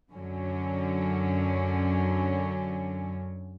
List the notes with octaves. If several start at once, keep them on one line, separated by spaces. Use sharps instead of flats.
F#2 D3 F#3 C#4